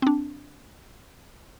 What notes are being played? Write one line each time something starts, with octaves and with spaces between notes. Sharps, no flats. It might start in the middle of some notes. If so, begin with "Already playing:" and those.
C4 D4